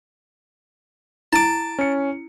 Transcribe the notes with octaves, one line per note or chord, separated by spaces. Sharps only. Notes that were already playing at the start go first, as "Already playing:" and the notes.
E4 A5 D6
C#4 C#7